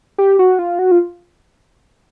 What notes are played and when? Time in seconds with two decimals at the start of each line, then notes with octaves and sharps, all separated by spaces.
0.18 G4
0.39 F#4
0.59 F4
0.79 F#4
0.91 F4